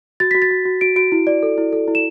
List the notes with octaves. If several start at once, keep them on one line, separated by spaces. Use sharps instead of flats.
F#4 A6
F#4 B6
A6
F#4
F#4
F#4 D7
F#4 D7
E4
D5
A4
E4
A4
E4
E7